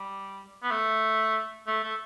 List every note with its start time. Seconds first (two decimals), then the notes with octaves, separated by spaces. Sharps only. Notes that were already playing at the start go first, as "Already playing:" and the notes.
Already playing: G3
0.63 B3
0.71 A3
1.67 A3
1.83 A3